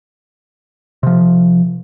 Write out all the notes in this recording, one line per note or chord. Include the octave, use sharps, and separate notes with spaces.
C3 F3